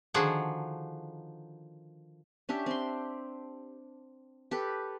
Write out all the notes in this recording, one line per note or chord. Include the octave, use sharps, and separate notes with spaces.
D3 D#3 F3 F#4 G#4 F#5
C#4 D4 G4 E5
C4 C6
G4 A4 B4